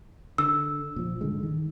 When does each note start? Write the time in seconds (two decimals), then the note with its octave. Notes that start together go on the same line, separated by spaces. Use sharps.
0.38 D3 E6
0.96 A#2 F3
1.21 G2 D3 G#3
1.43 D#3